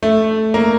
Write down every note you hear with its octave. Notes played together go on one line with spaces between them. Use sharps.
A3
A#3